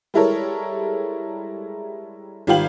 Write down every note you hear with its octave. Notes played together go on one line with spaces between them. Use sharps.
G3 G#3 E4 A4 A#4 C#5
G#1 G3 F4 F5 G5 F#7